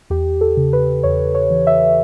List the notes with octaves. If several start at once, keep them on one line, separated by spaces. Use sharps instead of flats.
E2 G4
A4
C#3
B4
E2 C#5
C#5
E3
E5